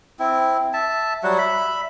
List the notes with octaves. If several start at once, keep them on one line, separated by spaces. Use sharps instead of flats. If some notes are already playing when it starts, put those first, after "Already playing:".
C4 E4
E5 A5
F#3 G3 F#4 F#5
E5 B5